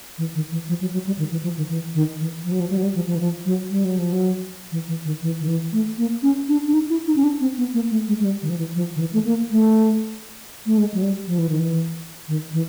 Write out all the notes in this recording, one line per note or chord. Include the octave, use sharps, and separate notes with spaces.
E3
D#3
E3
F3
F#3
F#3
G3
D#3
E3
F3
D#3
E3
D#3
E3
F3
F#3
F3
G3
F#3
G3
F3
F3
E3
F3
F#3
G3
F#3
F3
F#3
E3
E3
D#3
E3
D#3
E3
A3
A#3
C#4
D4
D4
D#4
E4
D#4
C#4
D4
C4
B3
A#3
A3
G#3
G#3
G3
D#3
F3
E3
F3
D#3
E3
A3
A#3
A3
A3
G#3
F#3
G3
F3
E3
D#3
E3
D#3
E3